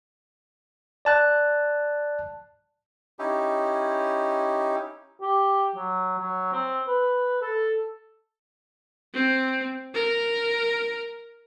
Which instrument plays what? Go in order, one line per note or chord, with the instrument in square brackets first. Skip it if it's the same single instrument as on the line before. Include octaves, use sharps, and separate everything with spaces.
[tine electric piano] D5 A5 F#6
[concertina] C#4 D#4 E4 G4
[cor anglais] G4
F#3
F#3
C4
B4
A4
[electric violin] C4
A#4